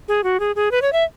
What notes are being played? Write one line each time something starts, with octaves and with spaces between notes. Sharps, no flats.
G#4
F#4
G#4
G#4
B4
C#5
E5